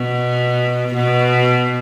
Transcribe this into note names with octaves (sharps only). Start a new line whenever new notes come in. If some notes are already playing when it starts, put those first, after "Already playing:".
Already playing: B2
B2